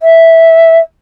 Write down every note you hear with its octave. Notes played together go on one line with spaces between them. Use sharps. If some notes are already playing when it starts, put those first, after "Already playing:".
E5